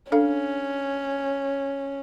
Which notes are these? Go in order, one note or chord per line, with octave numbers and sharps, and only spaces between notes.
C#4 D4 A4 F5